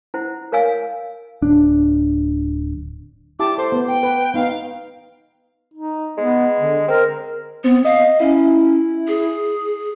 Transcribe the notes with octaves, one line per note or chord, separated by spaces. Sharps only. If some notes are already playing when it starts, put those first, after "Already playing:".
E4 C5 F#5
A#4 C#5 F5 G#5 E6
D1 D4
E4 G4 A5 D6
A4 C5
B3
G5
B4
B3 D#4 F5
D#4
G#3 B3
D3
C4 A#4
B3 C4
D#5 F5
C#4 E4
G#4